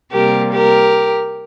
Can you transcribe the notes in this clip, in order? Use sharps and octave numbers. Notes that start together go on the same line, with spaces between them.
C3 G3 A#3 G4 A#4
G4 A#4